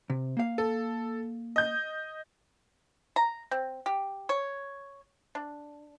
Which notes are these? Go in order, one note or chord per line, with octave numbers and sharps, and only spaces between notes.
C3
A#3 F5
A4
D#5 G6
A#5
C4
G4
C#5
D4